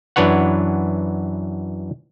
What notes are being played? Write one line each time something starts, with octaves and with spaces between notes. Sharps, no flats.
F#2 E3 D4 B4 C#5 F#5